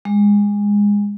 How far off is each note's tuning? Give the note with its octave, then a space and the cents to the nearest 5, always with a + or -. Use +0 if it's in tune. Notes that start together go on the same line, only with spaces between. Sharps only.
G#3 -20